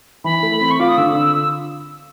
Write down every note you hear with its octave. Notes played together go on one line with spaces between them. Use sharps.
E3 B5
A3
C4
C#6
F4 D6
D#6
D3 E6